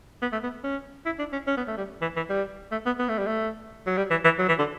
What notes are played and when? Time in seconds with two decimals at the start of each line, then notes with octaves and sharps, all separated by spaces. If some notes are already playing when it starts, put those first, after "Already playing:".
0.22 B3
0.32 A3
0.43 B3
0.64 C#4
1.06 E4
1.19 D4
1.33 C#4
1.47 C#4
1.57 B3
1.68 A3
1.78 G3
2.02 E3
2.16 E3
2.30 G3
2.72 A3
2.86 B3
2.99 B3
3.09 A3
3.18 G3
3.27 A3
3.86 F#3
3.97 G3
4.11 E3
4.24 E3
4.39 F#3
4.48 E3
4.59 D3